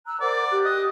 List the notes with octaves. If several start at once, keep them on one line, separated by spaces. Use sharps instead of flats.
A#5 E6 F#6
A#4 C5 D5 F#5
G4 F#6
D#5